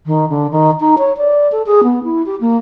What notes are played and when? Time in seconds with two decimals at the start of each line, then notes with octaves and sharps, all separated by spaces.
0.06 D#3
0.29 D3
0.51 D#3
0.80 D#4
0.98 C#5
1.17 D5
1.52 A4
1.66 G#4
1.83 B3
2.03 E4
2.26 G4
2.41 A#3